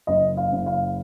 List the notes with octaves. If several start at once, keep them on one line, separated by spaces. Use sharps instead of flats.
F#1 D#5
F5
F#1
F5